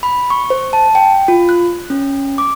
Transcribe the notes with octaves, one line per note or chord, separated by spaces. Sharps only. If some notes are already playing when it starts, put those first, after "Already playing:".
B5
C#6
C5
A5
G5
F4
F#6
C#4
D6